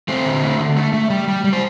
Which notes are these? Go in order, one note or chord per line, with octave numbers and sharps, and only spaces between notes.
A3 C4 C5
D3
A3
D3
A3
A3
G3
G3
G3
C5